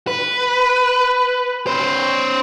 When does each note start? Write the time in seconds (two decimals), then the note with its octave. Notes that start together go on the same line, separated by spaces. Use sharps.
0.07 B4
1.67 C#4 C5